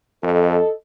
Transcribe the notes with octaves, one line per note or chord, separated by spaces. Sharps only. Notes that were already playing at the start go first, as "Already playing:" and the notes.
F2 A4 D#5